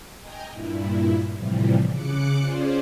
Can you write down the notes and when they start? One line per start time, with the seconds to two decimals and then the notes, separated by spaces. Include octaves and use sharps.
0.21 D#5 G5 G#5 A#5
0.52 G2 A#2 E4
1.36 A2 C3 E3 F3 G3
1.90 C#3 D6 F#6 C#7
2.39 C#4 F4 G#4 C5 D5